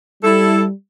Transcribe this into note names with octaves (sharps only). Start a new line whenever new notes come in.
G3 E4 A4